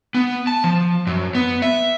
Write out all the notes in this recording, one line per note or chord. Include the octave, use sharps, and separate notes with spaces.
B3
A5
F3
F#2
B3
E5